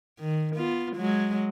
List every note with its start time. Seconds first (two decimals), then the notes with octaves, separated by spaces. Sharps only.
0.19 D#3
0.56 B3 F4
0.96 F#3 G#3